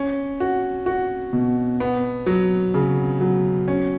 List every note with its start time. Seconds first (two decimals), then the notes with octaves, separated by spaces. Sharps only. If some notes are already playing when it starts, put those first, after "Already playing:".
Already playing: C#4
0.40 F#4
0.86 F#4
1.33 B2
1.80 B3
2.26 F#3
2.74 C#3
3.21 F#3
3.68 C#4